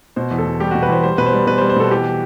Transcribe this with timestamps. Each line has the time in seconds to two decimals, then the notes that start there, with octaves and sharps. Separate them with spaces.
0.16 B2 C5
0.31 E2
0.38 A4
0.46 E2
0.60 G3 G4
0.71 B2 F#4
0.83 B4
0.89 E2 C5
1.03 G3 C5
1.18 B2 B4
1.26 C5
1.33 G3
1.47 B2 B4
1.58 C5
1.61 G3
1.69 C5
1.76 B2 A4
1.90 E3 G4